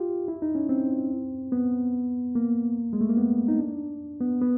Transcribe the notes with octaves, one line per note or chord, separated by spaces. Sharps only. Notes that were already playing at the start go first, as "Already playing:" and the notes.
Already playing: F4 G4
E4
D#4
C#4
C4
B3
A#3
G#3
A3
A#3
B3
D#4
D4
B3
B3